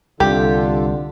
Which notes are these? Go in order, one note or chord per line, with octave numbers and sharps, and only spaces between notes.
C2 D3 D4 F4 G4 A4